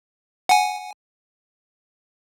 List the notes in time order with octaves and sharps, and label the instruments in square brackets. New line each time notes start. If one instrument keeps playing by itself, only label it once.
[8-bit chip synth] F#5 G#5